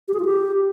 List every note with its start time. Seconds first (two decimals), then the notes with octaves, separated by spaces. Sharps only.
0.08 G4
0.14 G#4
0.19 F4
0.25 G4